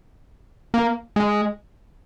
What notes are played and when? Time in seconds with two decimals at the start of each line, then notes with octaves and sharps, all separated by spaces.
0.74 A#3
1.16 G#3